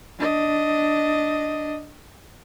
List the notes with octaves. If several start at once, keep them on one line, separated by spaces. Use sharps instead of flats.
D4 D#5